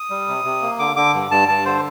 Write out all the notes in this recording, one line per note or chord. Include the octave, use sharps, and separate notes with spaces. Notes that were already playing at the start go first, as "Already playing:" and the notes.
Already playing: D#6
G3
C3
C3
A#3
D3 D6
D3 D6
G2
G2 A5
G2 A5
D3 C5